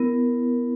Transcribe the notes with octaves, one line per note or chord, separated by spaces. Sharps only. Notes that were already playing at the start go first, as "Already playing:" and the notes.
Already playing: B3 E4 A#4